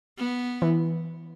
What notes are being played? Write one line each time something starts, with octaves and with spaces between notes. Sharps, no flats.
B3
E3